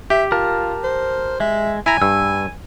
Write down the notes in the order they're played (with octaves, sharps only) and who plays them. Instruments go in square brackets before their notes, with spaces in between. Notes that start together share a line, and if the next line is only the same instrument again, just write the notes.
[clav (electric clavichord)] G4 [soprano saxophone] E5
[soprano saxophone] F4 [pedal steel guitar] A#4 A5
[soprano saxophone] C5
[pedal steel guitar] G#3 [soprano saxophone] E5
[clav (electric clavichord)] E4 A#5 [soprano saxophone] G#5
[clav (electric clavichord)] G2 [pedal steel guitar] E6